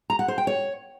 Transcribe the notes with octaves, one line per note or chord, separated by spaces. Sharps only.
A#5
F#5
C5
G5
C#5